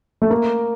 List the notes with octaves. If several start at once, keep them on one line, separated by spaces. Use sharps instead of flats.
A3
A#3